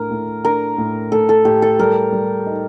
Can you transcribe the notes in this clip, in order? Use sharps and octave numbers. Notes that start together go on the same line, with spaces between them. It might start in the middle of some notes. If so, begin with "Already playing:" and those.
Already playing: A2 D4 A#4
A2
D4 A#4
A2
A2 A4
A4
A2 G4
A4
G3 A#4
G3
D#4